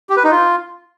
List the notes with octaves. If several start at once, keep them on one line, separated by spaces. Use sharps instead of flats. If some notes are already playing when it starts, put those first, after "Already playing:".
G4
B4
D#4
F4